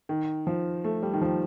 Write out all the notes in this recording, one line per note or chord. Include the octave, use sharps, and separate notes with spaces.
D#3
F3
A3
G3
D#3
F3